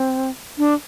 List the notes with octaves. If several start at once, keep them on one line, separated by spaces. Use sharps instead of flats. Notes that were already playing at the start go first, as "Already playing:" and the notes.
Already playing: C4
D4